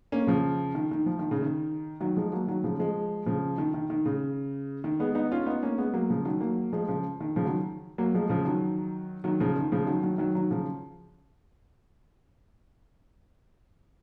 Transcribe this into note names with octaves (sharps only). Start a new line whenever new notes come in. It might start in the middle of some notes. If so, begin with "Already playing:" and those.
A#3 C#4
C#3 F3
D#3
D#3
F3
D#3
C#3
D#3
D#3 F#3
F3 G#3
F#3 A#3
D#3 F#3
C#3 F3
F3 G#3
C#3 F3
D#3
D#3
D#3
C#3
D#3
G#3 B3
B3 D#4
C#4 F4
B3 D#4
A#3 C#4
G#3 B3
F#3 A#3
C#3 F3
D#3 F#3
F#3 A#3
F3 G#3
C#3 F3
D#3
C#3 F3
D#3 F#3
F#3 A#3
F3 G#3
C#3 F3
D#3 F#3
D#3 F#3
C#3 F3
D#3
C#3 F3
D#3 F#3
D#3 F#3
D#3 F#3
D#3 F#3
C#3 F3